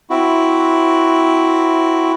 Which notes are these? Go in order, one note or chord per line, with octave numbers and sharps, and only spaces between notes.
C4 E4 F#4